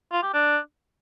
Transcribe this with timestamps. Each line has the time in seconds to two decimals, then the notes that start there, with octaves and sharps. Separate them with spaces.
0.12 F4
0.23 G4
0.34 D4